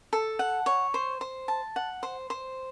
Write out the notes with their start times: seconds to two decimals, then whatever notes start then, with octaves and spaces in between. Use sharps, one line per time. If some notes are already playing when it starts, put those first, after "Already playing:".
0.13 A4
0.39 F#5
0.66 C#5
0.94 C5
1.21 C5
1.48 A5
1.76 F#5
2.03 C5
2.30 C5